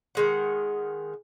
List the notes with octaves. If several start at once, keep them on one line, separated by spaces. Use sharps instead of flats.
D#3 G#3 F#5